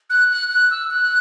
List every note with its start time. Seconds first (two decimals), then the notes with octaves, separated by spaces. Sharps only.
0.10 F#6
0.30 F#6
0.51 F#6
0.71 E6
0.91 F#6